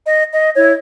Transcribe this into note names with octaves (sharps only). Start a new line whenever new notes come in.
D#5
D#5
E4 C#5